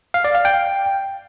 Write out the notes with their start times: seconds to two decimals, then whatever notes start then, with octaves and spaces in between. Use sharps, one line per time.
0.14 F5
0.24 D5
0.35 F5
0.45 G5